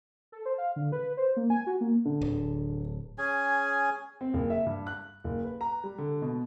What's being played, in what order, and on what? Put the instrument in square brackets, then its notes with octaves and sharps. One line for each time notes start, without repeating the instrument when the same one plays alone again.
[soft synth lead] A4
C5
F5
D3
B4
C5
A#3
G#5
F#4
A#3
[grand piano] D3
[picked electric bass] D1
[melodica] C#4 G#4 G#5
[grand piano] C4
F#1
E5
G2
F#6
F#1
B4
A#5
G3
D3
B2